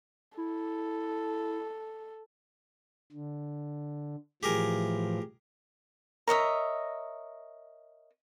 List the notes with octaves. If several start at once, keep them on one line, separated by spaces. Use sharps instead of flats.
E4 A4
D3
A2 E3 F3 G4 G#4 A#4
A#4 C#5 D#5 E5